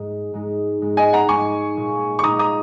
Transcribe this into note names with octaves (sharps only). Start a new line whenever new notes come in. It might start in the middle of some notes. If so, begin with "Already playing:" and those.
Already playing: G#2 G#3 D#4
G#2 G#3 D#4
G#2 G#3 D#4
D#5 G#5
F#5 A#5
G#2 G#3 D#4 G#5 C#6
A#2 G#3 D#4
C#6
A#2 G#3 D#4 A#5 D#6
A#5 D#6